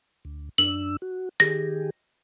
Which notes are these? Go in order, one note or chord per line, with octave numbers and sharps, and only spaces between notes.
D2
F#2 D4 E6 F#7
F#4
D#3 G4 G#4 A#6